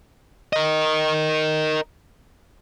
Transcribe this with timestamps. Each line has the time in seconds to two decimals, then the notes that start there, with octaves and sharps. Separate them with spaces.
0.53 A#4 D#5